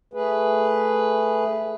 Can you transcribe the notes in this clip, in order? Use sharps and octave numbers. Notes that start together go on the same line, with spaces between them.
A3 G#4 B4